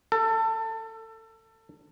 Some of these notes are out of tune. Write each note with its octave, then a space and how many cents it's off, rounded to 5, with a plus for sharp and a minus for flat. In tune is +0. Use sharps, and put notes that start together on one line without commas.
A4 +25